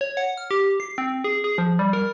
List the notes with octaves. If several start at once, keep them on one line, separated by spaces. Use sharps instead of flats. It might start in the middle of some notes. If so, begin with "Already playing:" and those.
C#5
F#5
F6
G4
C7
C4
G#4
G#4
F3
G3
A#4